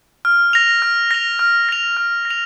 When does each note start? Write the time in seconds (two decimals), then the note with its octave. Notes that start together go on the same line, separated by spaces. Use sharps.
0.25 F6
0.53 A#6 F7
0.82 F6
1.11 A#6 F7
1.39 F6
1.69 A#6 F7
1.97 F6
2.25 A#6
2.31 F7